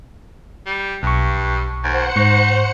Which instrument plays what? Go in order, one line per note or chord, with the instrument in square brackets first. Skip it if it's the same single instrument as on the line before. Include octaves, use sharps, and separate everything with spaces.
[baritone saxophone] G3
[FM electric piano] B1 C#6 [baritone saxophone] G2
[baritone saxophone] D#2 [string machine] C5 F#5 C#7
[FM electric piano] G#2 C#6 [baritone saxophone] D#4